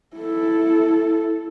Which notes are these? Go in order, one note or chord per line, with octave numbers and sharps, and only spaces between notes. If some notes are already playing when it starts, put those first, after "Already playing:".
E4 A4